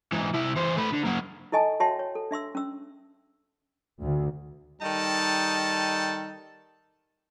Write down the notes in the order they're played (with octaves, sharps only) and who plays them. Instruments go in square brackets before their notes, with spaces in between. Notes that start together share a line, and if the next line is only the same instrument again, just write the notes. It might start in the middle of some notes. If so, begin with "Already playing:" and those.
[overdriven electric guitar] G#2 E3
C3 E4
E3 C5
A3 B4
D3
F#3 A#3
[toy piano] E4 A4 D#5 G#5 A5
F#4 C#5 E5 G5 A5 C6
C#5
A4
D4 E5 C6 E6
C#4 E6
[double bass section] D2
[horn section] D#3 G3 D#4 A4 A5